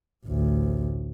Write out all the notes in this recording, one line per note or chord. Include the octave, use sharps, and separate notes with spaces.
A1 D2